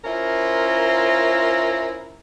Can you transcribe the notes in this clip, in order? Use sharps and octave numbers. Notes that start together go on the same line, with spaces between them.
C#4 E4 F4 A#4 C5